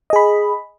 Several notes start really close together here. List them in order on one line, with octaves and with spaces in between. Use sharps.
D#5 G#4 B5